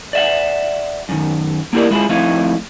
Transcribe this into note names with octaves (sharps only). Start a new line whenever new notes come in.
D5 E5 F#5
F#2 D#3
A#3 B3 E4 G4 A#4 D5
G#3 E4 F4 G#4
F3 A3 C4 D#4 E4 F5